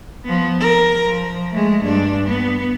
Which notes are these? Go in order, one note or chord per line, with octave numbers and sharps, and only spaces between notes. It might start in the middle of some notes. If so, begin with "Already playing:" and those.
F3 B3
A#4
F3
G#3 A3
G2 D4
B3